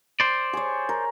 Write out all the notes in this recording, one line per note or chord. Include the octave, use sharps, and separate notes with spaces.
C5 D5
G#4 C#5
A#4